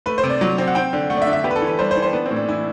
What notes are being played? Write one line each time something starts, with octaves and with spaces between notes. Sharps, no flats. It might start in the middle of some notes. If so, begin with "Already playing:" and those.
A3 B4
C5
C3
D5
F#3
C4
F#5
C4 G5
D3
A3 F#5
D5
E5
D3
E5
B3 G4
B4
A4
E3
B4
G3 C5
C5
E3
C5
B3 D4
C4
A2
D4
E3 E4